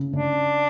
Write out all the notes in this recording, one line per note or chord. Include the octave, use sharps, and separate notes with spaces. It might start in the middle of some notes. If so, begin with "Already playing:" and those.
Already playing: C#3
C#3 D4